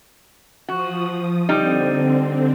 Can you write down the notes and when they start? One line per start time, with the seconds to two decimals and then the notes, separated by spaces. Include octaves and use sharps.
0.69 F3 F#4 D#6
1.49 D3 G3 C4 D#4